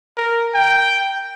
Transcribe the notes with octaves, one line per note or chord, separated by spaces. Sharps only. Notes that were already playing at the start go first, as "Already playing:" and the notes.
A#4
G5